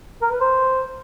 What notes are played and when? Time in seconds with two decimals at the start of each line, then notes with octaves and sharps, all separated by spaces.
0.22 A#4
0.31 B4
0.41 C5